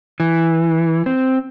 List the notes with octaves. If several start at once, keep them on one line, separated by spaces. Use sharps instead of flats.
E3
C4